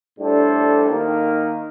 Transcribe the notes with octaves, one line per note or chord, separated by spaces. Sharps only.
A2 G3 D4 A4 C5
D#3 A#3 D#4 A#4